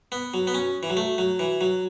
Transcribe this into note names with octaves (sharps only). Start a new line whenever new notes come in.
B3
F#3
B3
C#4
E3
F#3
A3
F#3
E3
F#3